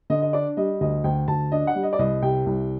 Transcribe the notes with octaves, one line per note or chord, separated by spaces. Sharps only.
D3 D#5
D#5
D4 D5
G3 D#5
D2 D#5
D2 G5
D2 A5
D4 D#5
F#5
G3
D#5
D5
C2 D#5
C3 G5
C2